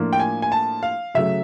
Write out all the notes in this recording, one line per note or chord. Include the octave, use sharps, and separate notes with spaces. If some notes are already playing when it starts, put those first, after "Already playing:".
Already playing: A2 F3 A#3 D4 F4
G5
G#5
G#5
A5
F5
C#3 F#3 A3 E5